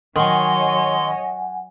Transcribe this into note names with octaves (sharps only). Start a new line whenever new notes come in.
D#3 F#3 C#5 D#5 F#5 G#5 C6